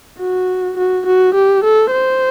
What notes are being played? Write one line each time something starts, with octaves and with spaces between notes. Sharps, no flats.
F#4
F#4
F#4
G4
A4
C5